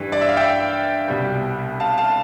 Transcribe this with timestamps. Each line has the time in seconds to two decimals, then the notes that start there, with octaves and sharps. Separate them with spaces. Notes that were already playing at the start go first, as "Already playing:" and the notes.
Already playing: G2 E3 G3
0.12 D5
0.21 E5
0.29 F5
0.37 E5 G5
1.08 C2 B2 G3
1.80 F5 A5
1.98 F5 A5